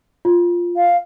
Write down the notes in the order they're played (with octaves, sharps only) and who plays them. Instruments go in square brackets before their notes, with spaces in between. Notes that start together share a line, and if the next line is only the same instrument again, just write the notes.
[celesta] F4
[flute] F5